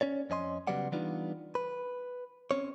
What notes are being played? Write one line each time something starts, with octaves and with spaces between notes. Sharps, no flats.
C#4 C#5 D5
F2 C#4 D#5 C6
C#3 F#3 G3 B3 D5 F#5
E3 G3 B3 D4 D#4 F4
B4
C4 C#4 C#5